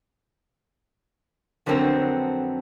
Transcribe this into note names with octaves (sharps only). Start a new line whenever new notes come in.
F2 D3 F#3 B3 C4 A#4